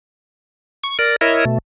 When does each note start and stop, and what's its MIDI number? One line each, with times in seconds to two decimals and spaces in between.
0.84 0.97 85
0.99 1.16 70
0.99 1.16 74
1.21 1.45 64
1.21 1.45 70
1.21 1.45 73
1.21 1.45 75
1.21 1.45 76
1.45 1.58 47
1.45 1.58 57